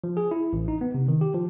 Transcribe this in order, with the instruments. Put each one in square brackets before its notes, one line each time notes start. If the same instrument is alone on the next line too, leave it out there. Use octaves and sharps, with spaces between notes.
[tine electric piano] F3
G#4
E4
A1
D#4
B3
C3
D#3
G4
F3